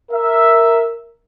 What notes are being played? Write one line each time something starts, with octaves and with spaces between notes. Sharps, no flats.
A#4 E5